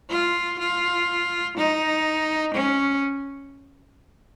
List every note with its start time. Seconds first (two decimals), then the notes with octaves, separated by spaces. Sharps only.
0.11 F4
0.59 F4
1.57 D#4
2.54 C#4